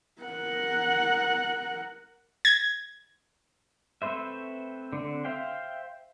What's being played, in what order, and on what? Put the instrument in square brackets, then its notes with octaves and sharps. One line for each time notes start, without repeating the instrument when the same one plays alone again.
[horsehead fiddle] A#4 F#5
[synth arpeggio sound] G#6
[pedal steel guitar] A3 C4 B4 C5 E5
D3 C4
C5 E5 F5 G5